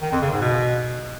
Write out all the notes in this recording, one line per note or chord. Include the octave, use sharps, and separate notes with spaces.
D#3
F2
C#3
G#2
B2